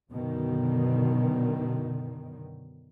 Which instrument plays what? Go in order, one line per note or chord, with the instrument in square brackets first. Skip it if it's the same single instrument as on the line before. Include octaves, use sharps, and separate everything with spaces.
[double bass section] F#2 B2 D3 D#3